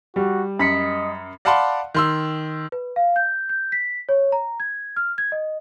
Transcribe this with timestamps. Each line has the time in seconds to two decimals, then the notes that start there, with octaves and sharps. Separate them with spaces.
0.16 G3 F#4
0.59 F#2 D#5 B5 B6 C#7
1.45 D5 F5 F#5 A5 B5 C6
1.94 D#3 C6 E6
2.72 B4
2.96 F5
3.16 G6
3.49 G6
3.72 B6
4.09 C#5
4.32 A#5
4.60 G#6
4.96 F6
5.18 G#6
5.32 D#5